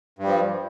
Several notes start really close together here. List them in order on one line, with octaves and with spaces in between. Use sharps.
G2 G3 F3